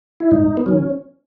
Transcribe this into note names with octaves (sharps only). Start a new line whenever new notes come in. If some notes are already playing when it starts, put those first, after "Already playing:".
E4
G#2 D#4
B3
D#3 F#3 C#4